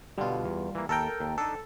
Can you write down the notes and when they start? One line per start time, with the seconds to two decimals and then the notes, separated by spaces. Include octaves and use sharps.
0.18 B2 D3 G3 F4
0.44 E2
0.75 E3 A#3
0.89 D#2 A4 A#4 G5
1.20 D#2
1.38 D4 D#4 A4